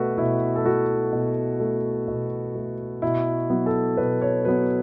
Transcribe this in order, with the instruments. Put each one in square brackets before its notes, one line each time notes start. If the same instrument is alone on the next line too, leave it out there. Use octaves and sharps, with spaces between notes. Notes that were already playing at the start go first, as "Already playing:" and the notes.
Already playing: [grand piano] B2 A3 F#4 A4 B4
B2 E4
A4
A3 F#4
B2
A3
B2
A3
B2 E4
F#3 B3
A4
B2 B4
C#5
F#3 B3 B4